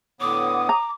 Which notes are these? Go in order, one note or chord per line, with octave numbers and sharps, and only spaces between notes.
A2 D3 B3 C#5 F#5 D6 D#6
A#5